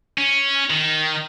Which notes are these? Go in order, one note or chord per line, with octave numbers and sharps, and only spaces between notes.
C#4
D#3